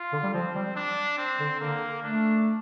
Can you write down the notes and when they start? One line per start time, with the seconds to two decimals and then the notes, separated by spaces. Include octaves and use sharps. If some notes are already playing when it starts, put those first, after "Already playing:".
Already playing: F4
0.13 D3
0.23 G3
0.34 F3 C4
0.55 G3
0.76 D4
1.18 C4
1.40 D3
1.60 D3 A#3
2.02 A3 D4